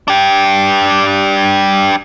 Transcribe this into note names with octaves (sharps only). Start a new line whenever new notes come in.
D4 G4